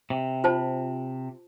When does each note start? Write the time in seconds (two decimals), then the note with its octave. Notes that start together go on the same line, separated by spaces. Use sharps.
0.10 C3
0.44 F4 C5 A5